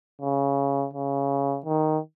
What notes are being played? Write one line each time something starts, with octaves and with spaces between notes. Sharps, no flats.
C#3
C#3
D#3